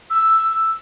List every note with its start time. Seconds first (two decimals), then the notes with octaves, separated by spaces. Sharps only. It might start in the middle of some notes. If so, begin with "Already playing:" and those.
0.10 E6